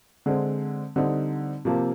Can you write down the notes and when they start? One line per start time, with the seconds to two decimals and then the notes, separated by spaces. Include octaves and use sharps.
0.26 D3 G#3 C4
0.96 D3 G3 C4 D#4
1.65 C3 F3 A#3